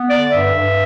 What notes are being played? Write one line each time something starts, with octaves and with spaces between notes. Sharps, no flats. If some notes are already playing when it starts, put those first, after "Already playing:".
Already playing: B3
D3 D5
G2 E5
G2